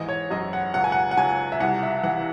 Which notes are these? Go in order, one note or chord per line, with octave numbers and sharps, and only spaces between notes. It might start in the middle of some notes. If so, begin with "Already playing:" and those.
Already playing: G#2 E3 D#5
C#5
F#2 D#5
F#5
C#2 F#5
G#5
F#5
F#5
C#2 G#5
E5
C2 F#5
E5
E3 F#5